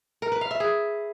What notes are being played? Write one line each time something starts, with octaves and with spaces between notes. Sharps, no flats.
A#4
B4
F5
E5
G#4